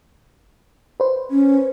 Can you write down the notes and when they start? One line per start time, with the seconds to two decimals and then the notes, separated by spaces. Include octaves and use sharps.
1.00 B4 C5
1.31 C#4